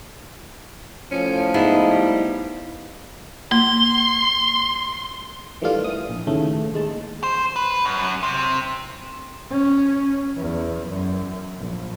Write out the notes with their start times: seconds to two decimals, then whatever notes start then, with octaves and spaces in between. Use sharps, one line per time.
1.11 A2 F3 C#4
1.54 G#3 B3 D#4 E4
1.91 G3
3.52 A#3 C6
5.62 D#3 E3 G3 A3 D4 F4
5.84 E3 D#6
6.09 A#1
6.27 D#2 A2 C#3 A3
6.74 D#2 G#3 A5
7.23 C5
7.56 B4
7.85 F#2
8.23 C3
9.51 C#4
10.36 E2
10.88 F#2
11.59 A#1